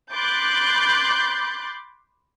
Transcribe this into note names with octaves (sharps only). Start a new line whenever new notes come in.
B5 C6 D6 F#6 G6 A6